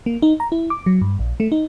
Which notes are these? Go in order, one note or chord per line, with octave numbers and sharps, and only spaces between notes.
A#3
D#4
A#5
E4
D6
F#3
G2
A#1
A3
D#4